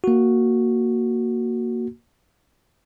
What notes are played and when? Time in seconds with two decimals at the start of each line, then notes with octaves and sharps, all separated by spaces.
0.04 A#3 F#4